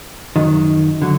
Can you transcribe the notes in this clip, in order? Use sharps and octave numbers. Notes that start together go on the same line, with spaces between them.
F#2 D#3 F#3
D3 F#3